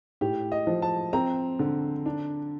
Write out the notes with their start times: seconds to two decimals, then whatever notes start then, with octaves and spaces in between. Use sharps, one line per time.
0.21 A2 G4
0.52 D#5
0.67 F3
0.82 A5
1.13 C4 A#5
1.59 D3
2.06 D4